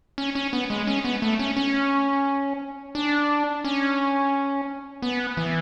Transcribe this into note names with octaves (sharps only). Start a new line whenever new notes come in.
C#4
C#4
B3
G#3
C#4
B3
A3
C#4
C#4
D4
C#4
B3
E3